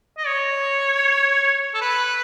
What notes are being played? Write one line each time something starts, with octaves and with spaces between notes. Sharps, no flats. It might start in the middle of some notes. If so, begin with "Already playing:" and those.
D#5
C#5
A4
B4